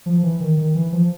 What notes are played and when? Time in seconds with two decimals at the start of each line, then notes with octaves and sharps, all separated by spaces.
0.06 F3
0.23 E3
0.40 D#3
0.57 D#3
0.75 E3
0.92 F3